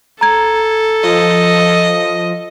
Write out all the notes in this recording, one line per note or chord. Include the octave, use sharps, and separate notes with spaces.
A4 A#5 G#6
F3 D#5